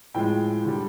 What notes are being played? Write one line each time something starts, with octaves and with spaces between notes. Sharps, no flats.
A2 F3 G#3 G5
D3 G3